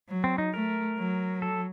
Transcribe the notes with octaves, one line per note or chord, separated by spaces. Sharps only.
F#3
C4
D#4
A3 A#4
F#3
A4